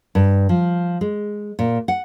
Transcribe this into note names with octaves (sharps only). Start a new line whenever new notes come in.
G2
F3
G#3
A#2
F#5